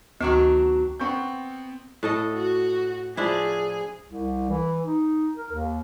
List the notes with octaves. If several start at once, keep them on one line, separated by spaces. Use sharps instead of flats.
D2 D#3 F#3 B3 D4 F#4
B3 C4 C#6 G6
A2 A4 D#5
F#4
F3 D4 E4 G#4
C2
E3
D#4
A#4
D#2